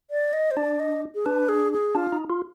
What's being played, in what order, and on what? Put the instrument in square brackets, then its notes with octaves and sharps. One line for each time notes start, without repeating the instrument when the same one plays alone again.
[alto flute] D5
D#5
C5
[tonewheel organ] D4 [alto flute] D5
[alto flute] D#5
G#4
[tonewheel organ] D4 [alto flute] B4
[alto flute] G#4
G#4
[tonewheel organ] D4 [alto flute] F4
[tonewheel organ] D#4
F4